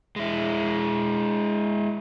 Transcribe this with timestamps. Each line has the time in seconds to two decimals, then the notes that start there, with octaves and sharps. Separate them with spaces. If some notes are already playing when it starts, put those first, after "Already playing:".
0.16 G#3 E4